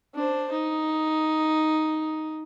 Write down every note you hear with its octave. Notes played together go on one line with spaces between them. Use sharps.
D4 C5
D#4